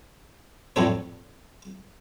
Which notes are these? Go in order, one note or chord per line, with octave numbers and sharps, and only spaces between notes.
F2 A2 D4 C#5